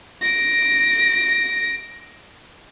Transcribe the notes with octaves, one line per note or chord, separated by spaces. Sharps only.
A#6 D7